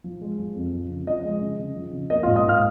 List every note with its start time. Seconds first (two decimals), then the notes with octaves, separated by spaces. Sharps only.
0.04 F3
0.21 G#3
0.38 F3
0.56 F2
0.73 F3
0.90 C#3
1.07 F3 D#5
1.24 G#3
1.41 C#3
1.59 C#3
1.76 F3
1.93 C#3
2.10 A#3 D#5
2.23 G#2 F4 F5
2.36 D#5 D#6
2.44 G#2 F5 F6